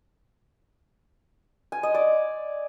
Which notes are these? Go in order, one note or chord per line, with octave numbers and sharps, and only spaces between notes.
G#5
D#5
D5